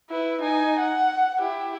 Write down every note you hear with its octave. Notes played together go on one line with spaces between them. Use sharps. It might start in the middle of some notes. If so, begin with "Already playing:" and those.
E4 B4
D#4 G#5
F#5
E4 G4